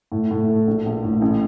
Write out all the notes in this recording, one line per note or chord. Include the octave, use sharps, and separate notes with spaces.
A2
A2
A3
A#1
A#1
A2
A1